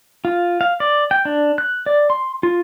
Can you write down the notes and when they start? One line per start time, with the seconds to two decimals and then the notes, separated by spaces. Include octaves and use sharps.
0.25 F4
0.61 F5
0.80 D5
1.11 G5
1.25 D4
1.58 F#6
1.86 D5
2.10 C6
2.43 F4